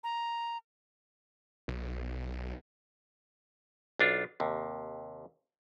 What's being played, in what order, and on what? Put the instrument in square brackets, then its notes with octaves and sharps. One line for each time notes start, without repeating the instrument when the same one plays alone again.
[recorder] A#5
[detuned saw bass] B1
[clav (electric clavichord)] B1 D4 F4
D#2 C3